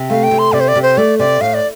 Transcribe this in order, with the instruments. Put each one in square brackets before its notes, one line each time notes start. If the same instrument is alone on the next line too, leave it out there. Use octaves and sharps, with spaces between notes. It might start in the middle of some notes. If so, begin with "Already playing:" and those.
Already playing: [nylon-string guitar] C3
[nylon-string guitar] A3 [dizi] F5
[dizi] G5
[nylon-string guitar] C3
[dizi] C6
[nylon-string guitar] C3 [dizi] D5
[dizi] C5
D5
[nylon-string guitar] C3
[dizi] C5
[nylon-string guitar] A3 [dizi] D5
[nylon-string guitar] C3 [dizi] D5
[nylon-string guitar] A2 [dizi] F5
[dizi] D5